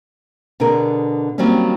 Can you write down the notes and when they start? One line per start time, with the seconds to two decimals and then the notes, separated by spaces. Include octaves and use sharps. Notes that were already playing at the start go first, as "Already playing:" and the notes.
0.60 B2 D3 D4 G#4 A#4
1.38 D#3 F#3 G3 A#3 C4 C#4